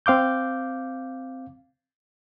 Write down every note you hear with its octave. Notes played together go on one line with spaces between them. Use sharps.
C4 F5 D6 G6